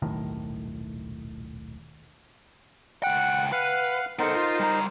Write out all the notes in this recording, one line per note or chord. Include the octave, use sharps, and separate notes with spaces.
D#1 B1 A2 D#3
C#2 F#5 G5
B4 F5 F#5
B3 D#4 A4 A#4 C5
F4
G3 A#5